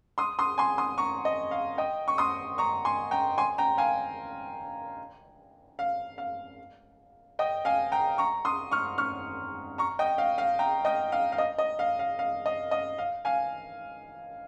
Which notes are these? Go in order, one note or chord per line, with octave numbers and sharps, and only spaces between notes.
C6 D#6
C6 D#6
G#5 C6
C6 D#6
A#5 C#6
D#5
F5
D#5 G5
C#6
C6 D#6
A#5 C#6
G#5 C6
G5 A#5
G#5 C6
G5 A#5
F5 G#5
F5
F5
D#5 G5
F5 G#5
G5 A#5
A#5 C#6
C6 D#6
C#6 F6
C#6 F6
A#5 C#6
D#5 G5
F5
F5
G5 A#5
D#5 G5
F5
F5
D#5
D#5
F5
F5
F5
D#5
D#5
F5
F5 G#5